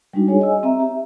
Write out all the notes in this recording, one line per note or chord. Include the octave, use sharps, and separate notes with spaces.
G3 G#3 D4 D#4 F#4
G#4 C#5 G#5
D#5 G#5 E6
C4 E5 A#5
G4 E5